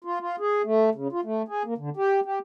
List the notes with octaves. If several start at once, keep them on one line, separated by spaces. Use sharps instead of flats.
F4
F4
G#4
A3
C#3
F4
A3
G#4
A#3
D3
G4
G4